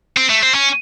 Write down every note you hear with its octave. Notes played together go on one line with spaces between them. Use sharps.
C4
A3
C4
C#4